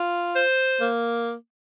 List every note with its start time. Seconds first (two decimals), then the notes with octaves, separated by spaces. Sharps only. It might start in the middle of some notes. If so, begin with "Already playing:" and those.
Already playing: F4
0.35 C5
0.81 A#3